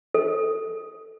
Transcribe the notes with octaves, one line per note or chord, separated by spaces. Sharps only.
A4